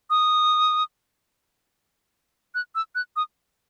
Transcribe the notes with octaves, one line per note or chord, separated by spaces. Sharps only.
D#6
F#6
E6
F#6
D#6